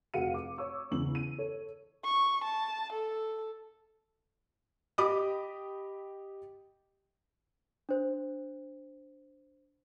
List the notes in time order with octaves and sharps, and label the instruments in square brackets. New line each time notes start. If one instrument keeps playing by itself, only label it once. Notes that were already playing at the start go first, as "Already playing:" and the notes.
[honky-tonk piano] F1 F#4 G#4 F5 C#7 D#7
D6
C#5 C#6 D6 E6
E2 C#3 F#7
D#7
A4 C#5
[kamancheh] C#6
A5
A4
[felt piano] G4 D#5 B5 D6 D#6
[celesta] D4 C5